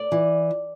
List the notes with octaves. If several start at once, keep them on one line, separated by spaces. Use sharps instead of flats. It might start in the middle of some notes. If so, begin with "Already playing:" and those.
Already playing: D5
E3